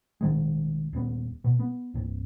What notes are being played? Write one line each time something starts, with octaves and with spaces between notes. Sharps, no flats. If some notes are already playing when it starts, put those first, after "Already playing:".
B1 D#3 G#3
D#1 B3
B2
B3
C2 G2